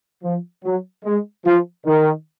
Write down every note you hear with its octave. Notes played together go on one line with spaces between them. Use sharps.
F3
F#3
G#3
F3
D#3